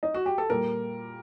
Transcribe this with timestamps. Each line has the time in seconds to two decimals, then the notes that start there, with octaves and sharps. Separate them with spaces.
0.03 D#4
0.14 F#4
0.26 G4
0.38 A4
0.50 A#2 G3 A#4